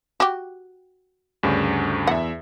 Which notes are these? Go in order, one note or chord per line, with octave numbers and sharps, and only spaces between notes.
F#4 G4
D2 G2 C#3
E2 E5 F#5